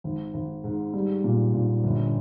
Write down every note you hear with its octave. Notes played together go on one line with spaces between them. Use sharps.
G#1
G#1
G#2
G3
A#2
A#2
G1